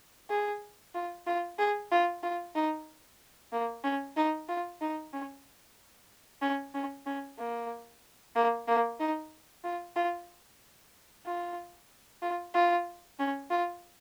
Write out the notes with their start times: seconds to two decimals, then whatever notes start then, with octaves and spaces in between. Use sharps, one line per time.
0.29 G#4
0.94 F4
1.27 F4
1.58 G#4
1.91 F4
2.23 F4
2.55 D#4
3.52 A#3
3.84 C#4
4.16 D#4
4.49 F4
4.81 D#4
5.13 C#4
6.42 C#4
6.74 C#4
7.06 C#4
7.38 A#3
8.35 A#3
8.68 A#3
9.00 D#4
9.64 F4
9.96 F4
11.25 F4
12.22 F4
12.54 F4
13.19 C#4
13.50 F4